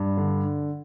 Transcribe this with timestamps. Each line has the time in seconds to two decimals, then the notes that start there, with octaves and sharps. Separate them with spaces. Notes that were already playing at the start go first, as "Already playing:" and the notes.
Already playing: G2
0.17 D3